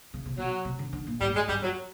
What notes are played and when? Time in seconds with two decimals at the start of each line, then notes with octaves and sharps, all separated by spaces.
0.14 C#3
0.26 C3
0.37 B2 F#3
0.65 C3
0.79 D3
0.93 D3
1.07 A#2
1.21 A2 G3
1.34 G#2 G#3
1.48 G2 G3
1.62 F#2 F#3